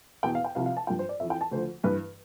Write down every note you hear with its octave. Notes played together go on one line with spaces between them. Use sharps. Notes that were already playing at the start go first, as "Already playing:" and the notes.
E2 B2 G5
F5
G5
C2 C3 F3 F5
F5
A5
G2 F3 G5
C5
D5
F2 E3 E5
G5
A5
D2 D3 F3 C5
G2 E3 B4